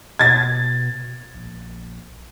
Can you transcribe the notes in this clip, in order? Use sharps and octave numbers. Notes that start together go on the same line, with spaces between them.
B2 G#6 A6
A#1